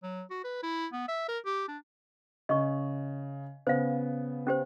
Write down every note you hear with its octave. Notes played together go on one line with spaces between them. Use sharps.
F#3
F#4
B4
E4
B3
E5
A#4
G4
D4
C#3 D#5 C#6
C#3 B3 C5 F5
C#4 G4 C5